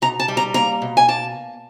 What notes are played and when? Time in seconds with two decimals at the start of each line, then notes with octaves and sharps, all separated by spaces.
0.02 B2 A#5
0.20 A5
0.28 G3
0.37 A#5
0.54 A#3 A#5
0.82 B2
0.97 G#5
1.08 A#3 A5